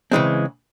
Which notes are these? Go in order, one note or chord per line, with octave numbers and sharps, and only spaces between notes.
C#3 E3 G#3 C4